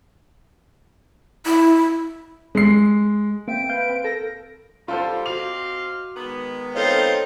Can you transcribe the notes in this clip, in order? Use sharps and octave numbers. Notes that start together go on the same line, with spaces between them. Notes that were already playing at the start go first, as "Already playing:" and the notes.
E4
G#3 C7
A#3 C4 E5 G5 D7
B4 F5 G6
C4
A4 A#4 A#6
D3 G3 F4 A4 C5
C4 F#4 D#5 F5 D6 F7
D#3 G#3 B3
C4 D#4 F4 A4 C#5